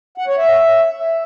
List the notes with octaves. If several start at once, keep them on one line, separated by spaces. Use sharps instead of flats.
F#5
C#5
E5